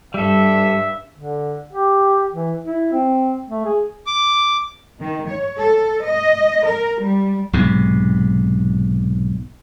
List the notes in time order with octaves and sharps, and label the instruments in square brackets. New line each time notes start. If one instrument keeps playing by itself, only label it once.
[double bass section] G2 [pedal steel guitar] G3 A4 [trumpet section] E5
[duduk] D3
G4
E3
E4
C4
A3
G#4
[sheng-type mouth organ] D6
[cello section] D#3
C#5
A4
D#5
A#4
G3
[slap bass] B1 G#2 C3